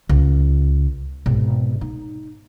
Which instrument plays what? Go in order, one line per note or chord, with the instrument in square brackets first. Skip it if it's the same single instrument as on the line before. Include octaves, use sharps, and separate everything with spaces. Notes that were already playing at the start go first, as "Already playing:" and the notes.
[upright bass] C#2
G#1 B2
D#4